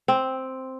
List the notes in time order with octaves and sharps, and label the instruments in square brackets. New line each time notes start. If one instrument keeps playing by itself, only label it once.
[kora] C4